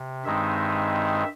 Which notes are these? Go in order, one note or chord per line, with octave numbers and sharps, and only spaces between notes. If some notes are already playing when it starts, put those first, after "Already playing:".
Already playing: C3
G2 D#3 G#3 C4 D#4 E5